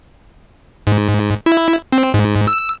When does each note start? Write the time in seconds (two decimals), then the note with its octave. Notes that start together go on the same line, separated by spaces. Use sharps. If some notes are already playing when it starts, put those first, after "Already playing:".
0.87 G#2
1.46 E4
1.92 C4
2.14 G#2
2.48 E6